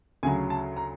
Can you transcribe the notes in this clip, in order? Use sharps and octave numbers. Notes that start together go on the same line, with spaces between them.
D2 C#3 F#3 G#5
A5
A#5